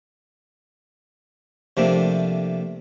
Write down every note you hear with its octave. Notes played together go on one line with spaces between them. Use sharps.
C3 F3 A3 A#3 D4